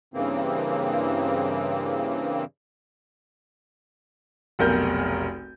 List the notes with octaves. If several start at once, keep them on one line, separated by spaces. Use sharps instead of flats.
G2 C#3 E3 A#3 C4
F1 B1 A#4 G6